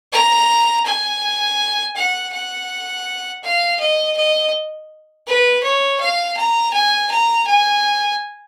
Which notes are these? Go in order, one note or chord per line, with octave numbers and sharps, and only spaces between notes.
A#5
G#5
F#5
F#5
F5
D#5
D#5
B4
C#5
F5
A#5
G#5
A#5
G#5